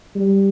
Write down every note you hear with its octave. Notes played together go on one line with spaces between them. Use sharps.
G3